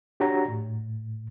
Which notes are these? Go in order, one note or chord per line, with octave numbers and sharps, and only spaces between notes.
D4 F#4 G4 C#5 F#5 A#5
A2